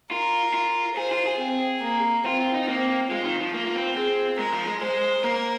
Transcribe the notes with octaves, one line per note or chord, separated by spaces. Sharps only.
F4 A#4
F4
G#4 C5
F4
G#4
C4
A#3
C4 F4
F4
D#4
A#3 C4
G#3 F4
D#3
F3
A#3 F4
A#3
C4
C4 G#4
G#3 A#4
F3
G#3
G#3 C5
A#3 A#4